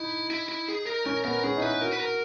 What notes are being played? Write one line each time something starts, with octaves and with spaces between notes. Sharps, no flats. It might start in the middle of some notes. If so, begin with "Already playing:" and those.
Already playing: D#4 E4
E4
E4
G#4
A#4
C#4 A#4
B3 A#4
C#4 G#4
D#4
E4 B4
F#4 A#4
B4
A#4